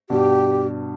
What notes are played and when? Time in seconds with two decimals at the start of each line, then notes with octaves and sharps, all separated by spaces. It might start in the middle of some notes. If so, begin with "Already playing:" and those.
0.10 G2 B2 G4